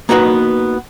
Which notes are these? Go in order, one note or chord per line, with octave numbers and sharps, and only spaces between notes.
A#3 B3 D#4 F#4 A#4 B4